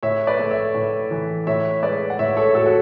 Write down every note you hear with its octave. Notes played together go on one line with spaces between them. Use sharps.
A2 C#5 E5
B4 D5
A3
C#5 E5
A2
E3
A2 C#5 E5
G#3 B4 D5
F#5
A2 C#5 E5
A4 C#5
A2 F#4 A4
F#4